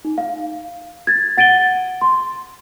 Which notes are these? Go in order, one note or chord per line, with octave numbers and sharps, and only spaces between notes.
D#4
F5
G#6 A6
F#5 A6 D7 D#7 G7
C6